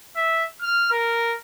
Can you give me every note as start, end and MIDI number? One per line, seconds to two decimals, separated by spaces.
0.16 0.45 76
0.62 0.89 89
0.91 1.35 70